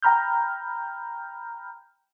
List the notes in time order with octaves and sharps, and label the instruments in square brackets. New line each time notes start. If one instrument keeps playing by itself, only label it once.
[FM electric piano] G5 A#5 B5 F6 G6